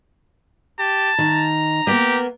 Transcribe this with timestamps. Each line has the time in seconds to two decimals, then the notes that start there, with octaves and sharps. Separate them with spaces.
0.79 G4 A5
1.18 D#3 A#5
1.87 A#3 B3 G4 A#4